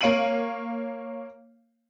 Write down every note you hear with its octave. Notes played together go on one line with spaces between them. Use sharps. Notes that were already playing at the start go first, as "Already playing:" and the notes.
A#3 C#5 F5 D7 D#7 F#7